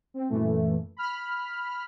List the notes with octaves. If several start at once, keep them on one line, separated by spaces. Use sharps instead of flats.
C4
F#2 A#2 E3 A3
B5 F6